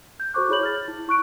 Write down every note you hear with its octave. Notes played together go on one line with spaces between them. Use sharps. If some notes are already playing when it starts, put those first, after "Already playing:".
G6
F#4 A4 C5 C#6 D6 F#6
E4 G#4 C#5 B5 G6 F#7
F6 A6
E4
E4 C#6 F#6 D7